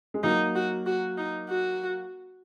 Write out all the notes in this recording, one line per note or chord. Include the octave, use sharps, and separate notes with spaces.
G#3
F#3 A#3 D#4
F#4
F#4
D#4
F#4